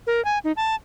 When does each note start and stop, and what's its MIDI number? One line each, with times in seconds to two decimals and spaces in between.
0.07 0.23 70
0.25 0.39 80
0.44 0.52 63
0.57 0.75 81